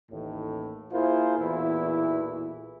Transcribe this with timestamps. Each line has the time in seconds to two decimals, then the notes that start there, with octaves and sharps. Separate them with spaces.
0.10 A1 D#2 A2
0.92 A#3 E4 F4 G#4 A#4 C5
1.38 B1 E2 A#2 E3 E4